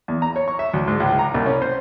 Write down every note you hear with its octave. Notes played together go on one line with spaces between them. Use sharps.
E2
A#5
C#5
C#6
E5
D2
G#2
C#2
A#5
C2
C#4
C5